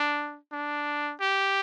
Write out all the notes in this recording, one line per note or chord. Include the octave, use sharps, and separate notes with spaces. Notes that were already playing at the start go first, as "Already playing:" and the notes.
Already playing: D4
D4
G4